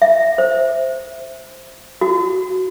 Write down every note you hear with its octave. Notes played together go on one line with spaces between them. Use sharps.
E5
C5
F#4